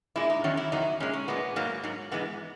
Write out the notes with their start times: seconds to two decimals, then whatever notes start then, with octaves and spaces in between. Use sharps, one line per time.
0.16 A#2 G#3 E4
0.30 D#4
0.44 E2 D#3 F#3 C#4
0.57 E4
0.72 E2 D#3 F#3 D#4
1.00 A#2 G#3 C#4
1.13 C#4
1.28 A#2 G#3 B3
1.56 G#2 F#3 A#3
1.84 G#2 F#3
2.11 G#2 E3 G#3 B3